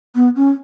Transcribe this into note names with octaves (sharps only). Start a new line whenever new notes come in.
B3
C#4